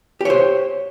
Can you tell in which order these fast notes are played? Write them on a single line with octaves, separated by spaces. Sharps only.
G4 C#5 C5